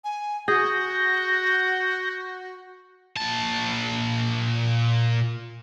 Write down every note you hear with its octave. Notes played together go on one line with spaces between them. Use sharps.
G#5
F#4 G#4 G6 A#6
A#2 A5